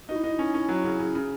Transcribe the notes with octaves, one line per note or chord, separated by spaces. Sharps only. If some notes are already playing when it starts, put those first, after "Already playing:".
D#4 F#4
E4
D#4
C#4
C#4
F#3
C#3
C#3
C#3